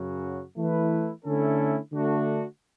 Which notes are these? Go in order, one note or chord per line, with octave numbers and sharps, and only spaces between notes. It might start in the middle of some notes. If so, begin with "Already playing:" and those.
Already playing: F#2 C#3 F#3 C#4 F#4
E3 A3 E4 B4
D3 A3 C#4 E4 A4
D3 A3 D4 F#4